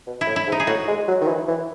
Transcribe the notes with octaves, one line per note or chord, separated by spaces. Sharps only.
B2
E4
A2
E4
G#2
D#4
G#4
A2 F#4
G#3
F#3
D#3
E3
E3